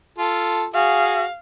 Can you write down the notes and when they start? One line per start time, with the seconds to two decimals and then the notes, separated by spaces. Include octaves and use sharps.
0.18 F4 A4
0.74 F#4 G#4 F5